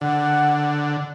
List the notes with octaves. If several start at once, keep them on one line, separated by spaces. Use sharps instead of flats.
D3 F#5